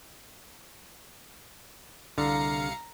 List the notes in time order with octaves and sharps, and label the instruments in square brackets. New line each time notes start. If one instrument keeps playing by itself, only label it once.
[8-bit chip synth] C2 F5 C#7 [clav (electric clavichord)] D3 [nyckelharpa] A#5